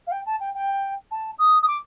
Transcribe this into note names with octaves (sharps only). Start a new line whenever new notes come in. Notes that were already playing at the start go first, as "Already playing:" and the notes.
F5
G5
A5
G5
G5
A5
D#6
D#6
D6